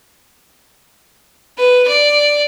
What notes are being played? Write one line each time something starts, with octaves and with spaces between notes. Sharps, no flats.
B4
D5